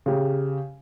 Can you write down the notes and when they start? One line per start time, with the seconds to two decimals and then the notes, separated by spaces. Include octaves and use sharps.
0.06 C#3 G4